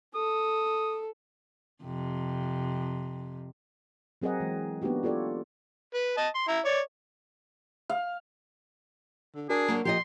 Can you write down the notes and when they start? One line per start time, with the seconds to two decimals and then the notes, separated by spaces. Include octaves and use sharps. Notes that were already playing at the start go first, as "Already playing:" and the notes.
0.15 A4 D#6
1.84 F2 C3
4.22 F#3 C4 G#4 A#4 D#5 F#5
4.40 E3 G#3
4.82 A#3 B3 D4 D#4 F#4 G4
5.03 F4 G4 A4 C#5 D5
5.94 B4
6.17 D#5 A5
6.35 C6
6.48 E4 A#5
6.65 C#5 D5
7.89 F5
9.35 D3
9.49 D4 F#4 G#4 A#4 G#5
9.68 F#3 A#3
9.85 A#2 F3 G4 D5 D#5 C6